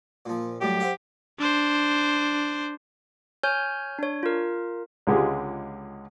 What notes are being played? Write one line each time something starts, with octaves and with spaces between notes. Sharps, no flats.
A#2 F3
F#2 A2 G3 G4
C5 E5 F#5
D4 C5
C#5 G#5 F6 G6
D4 C#5
F4 A#4
C#2 D3 G#3 F4 G4 G#4